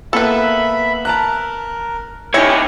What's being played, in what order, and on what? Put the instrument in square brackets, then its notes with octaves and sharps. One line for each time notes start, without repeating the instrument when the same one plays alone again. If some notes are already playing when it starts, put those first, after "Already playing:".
[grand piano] A#3 B3 [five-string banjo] A4 B4 [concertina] E5 B5
[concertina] A#4 [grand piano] A5 A#5 F#6
[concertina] C#4 G4 [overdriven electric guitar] D#4 C#5 [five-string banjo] E4 [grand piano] G#6 A#6 C#7